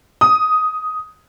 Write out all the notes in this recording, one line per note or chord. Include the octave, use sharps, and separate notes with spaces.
D#6